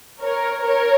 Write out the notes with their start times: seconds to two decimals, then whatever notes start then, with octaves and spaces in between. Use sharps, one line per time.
0.22 A#4 C#5
0.62 A#4 C#5